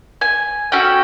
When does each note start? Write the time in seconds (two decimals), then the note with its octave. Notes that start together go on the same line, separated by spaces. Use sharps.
0.21 G#5
0.72 C#4 F#4 A4 G5